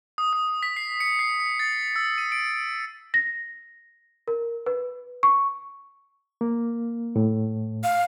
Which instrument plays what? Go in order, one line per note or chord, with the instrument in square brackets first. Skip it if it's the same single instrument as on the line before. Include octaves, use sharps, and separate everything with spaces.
[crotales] D#6
D#6
B6
C7
C#7
C7
C#7
A6
E6
D#7
D7
[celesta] A#6
A#4
B4
C#6
[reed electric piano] A#3
A2
[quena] F5